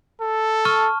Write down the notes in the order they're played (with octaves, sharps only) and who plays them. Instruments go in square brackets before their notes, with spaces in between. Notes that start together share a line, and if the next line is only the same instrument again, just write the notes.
[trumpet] A4
[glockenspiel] A5 C#6 F6